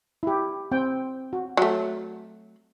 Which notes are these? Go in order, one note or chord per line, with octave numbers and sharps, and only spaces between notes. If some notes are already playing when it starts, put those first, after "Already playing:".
E4 G4
C4 G5
F#4
F#3 A3